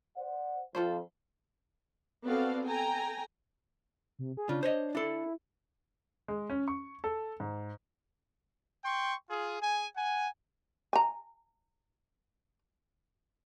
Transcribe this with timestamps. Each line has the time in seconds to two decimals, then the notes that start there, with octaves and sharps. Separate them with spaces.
0.16 C5 D5 F#5
0.75 F2 F4 A4 C5
2.25 B3 C4 F#4 A4 D5 F5
2.66 A4 G5 G#5 A#5
4.19 C3
4.37 G#4
4.49 C#3 D4 F4
4.63 C5 C#5 D#5
4.95 D4 E4 A4
6.28 G#3
6.50 C#4
6.68 C#6
7.04 A4
7.40 G#2
8.85 G5 C6 C#6
9.30 F4 G#4
9.61 G#4 G#5
9.96 F#5 G#5
10.93 G#5 A#5